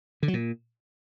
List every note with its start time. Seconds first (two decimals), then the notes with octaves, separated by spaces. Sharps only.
0.23 D3
0.28 F#3
0.33 A#2